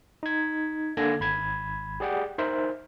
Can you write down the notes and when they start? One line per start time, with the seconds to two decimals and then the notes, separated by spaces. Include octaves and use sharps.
0.23 D#4 G#6
0.97 D3 A#3 A4 G#5 G#6 A#6
1.20 G#1 B5 G#6
2.00 G4 G#4 D5 F#5 G5
2.38 D#4 A#4 C5 E5